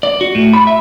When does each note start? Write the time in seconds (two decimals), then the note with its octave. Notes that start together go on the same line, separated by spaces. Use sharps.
0.03 D5
0.21 F#4
0.35 A2
0.54 B5
0.67 E5